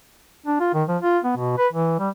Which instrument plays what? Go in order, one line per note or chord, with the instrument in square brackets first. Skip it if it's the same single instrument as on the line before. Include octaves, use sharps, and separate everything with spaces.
[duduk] D4
F4
D#3
F3
F4
B3
B2
B4
E3
G3